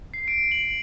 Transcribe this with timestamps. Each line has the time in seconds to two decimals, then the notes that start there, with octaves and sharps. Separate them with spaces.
0.14 C7
0.28 D7
0.52 F#7